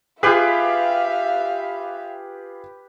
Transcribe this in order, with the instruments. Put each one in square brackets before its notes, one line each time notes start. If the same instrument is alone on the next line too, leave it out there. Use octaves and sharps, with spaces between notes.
[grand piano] F4 G#4 [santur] G4 B4 [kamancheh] E5 F5